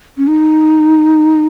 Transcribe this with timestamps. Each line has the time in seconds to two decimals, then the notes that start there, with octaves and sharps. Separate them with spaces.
0.18 C#4
0.28 D#4